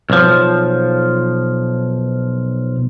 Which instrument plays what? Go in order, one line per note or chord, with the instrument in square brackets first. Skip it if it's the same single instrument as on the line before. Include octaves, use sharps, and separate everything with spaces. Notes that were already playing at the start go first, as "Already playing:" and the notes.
[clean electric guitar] B1 F3